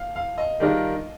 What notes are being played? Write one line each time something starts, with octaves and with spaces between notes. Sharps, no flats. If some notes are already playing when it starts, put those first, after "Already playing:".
Already playing: F5
F5
D#5
D#3 G3 D4 F4 A#4